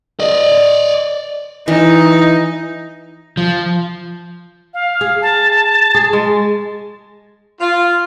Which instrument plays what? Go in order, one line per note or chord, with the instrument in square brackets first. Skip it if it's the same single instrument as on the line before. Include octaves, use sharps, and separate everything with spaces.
[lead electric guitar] D5 D#5
[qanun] E3 [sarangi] D#4
[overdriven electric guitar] F3
[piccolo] F5
[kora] G#4
[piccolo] A5
[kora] G#4
G#3
[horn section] F4